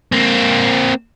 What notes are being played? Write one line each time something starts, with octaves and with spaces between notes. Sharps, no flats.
A#3 C4